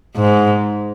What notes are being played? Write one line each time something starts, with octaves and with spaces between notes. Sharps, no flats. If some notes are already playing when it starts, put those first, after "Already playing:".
G#2